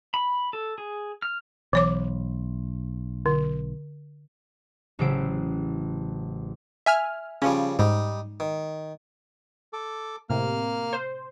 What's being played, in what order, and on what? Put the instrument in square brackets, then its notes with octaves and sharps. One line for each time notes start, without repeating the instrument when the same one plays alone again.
[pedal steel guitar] B5
A4
G#4
F6
[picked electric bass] B1 [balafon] E3 C#5 D6
[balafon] D3
[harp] A1 C#3 F#3 E4 C5 D7
[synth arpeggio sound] E5 G#5 F6
[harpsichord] C#3 F3 G3 [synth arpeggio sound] C#4
[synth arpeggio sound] G#2 [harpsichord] G3 D#4
[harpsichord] D#3
[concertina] A4 D6
[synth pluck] A2 C3 [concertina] A#3 F6
[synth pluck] C5